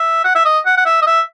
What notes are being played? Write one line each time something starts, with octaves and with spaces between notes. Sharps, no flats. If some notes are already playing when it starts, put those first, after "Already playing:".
Already playing: E5
F#5
E5
D#5
F#5
F#5
E5
D#5
E5